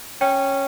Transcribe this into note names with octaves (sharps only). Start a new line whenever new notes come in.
C#4 G5